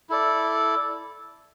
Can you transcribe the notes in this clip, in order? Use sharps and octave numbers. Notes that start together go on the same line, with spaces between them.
E4 A4 D5